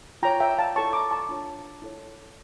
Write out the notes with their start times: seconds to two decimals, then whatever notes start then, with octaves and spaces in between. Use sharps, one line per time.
0.23 F4 C#5 G5 A#5
0.40 E5 G5
0.58 F5 A5
0.76 E4 A4 C#5 A5 C#6
0.93 A#5 D6
1.11 A5 C#6
1.29 D4 F4 C#5
1.82 E4 A4 C#5